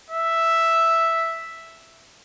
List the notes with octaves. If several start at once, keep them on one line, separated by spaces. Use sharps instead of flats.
E5